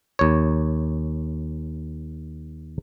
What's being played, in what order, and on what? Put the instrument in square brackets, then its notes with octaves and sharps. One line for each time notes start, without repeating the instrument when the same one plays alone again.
[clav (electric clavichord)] D#2 C#5